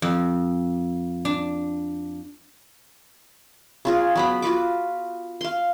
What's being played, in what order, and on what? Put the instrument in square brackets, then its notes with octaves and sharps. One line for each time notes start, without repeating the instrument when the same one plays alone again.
[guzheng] F2
D4
[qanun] C#3 F4 G#4
F#3 B3 B5
F4 F#4 B4 D6
F5 C6